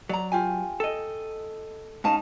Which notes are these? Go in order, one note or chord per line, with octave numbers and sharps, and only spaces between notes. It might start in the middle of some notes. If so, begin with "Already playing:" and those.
F#3 D5 A#5
F4 G4 G#5
A4 D#5
G#2 C#4 D#4 F5 A5